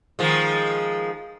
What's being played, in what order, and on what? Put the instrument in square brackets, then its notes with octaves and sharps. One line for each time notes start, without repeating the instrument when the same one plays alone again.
[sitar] D#3 F3 G#3